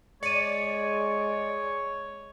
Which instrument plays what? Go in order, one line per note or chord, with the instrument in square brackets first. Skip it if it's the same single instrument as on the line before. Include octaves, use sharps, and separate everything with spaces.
[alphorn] G#3 [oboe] C#5 [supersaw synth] D5 [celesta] C#7 D#7